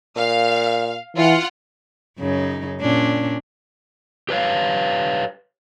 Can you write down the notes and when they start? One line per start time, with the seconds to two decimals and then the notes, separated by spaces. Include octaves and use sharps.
0.16 A#2 F5
1.16 E3 F4 F#5
2.19 F#2 C#3 D#4
2.81 A#2 C#4 D4
4.29 G4 B4 C#5 F5